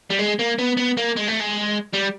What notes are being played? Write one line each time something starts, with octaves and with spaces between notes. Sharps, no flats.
G3
G#3
A#3
B3
B3
A#3
G#3
A3
G#3
G3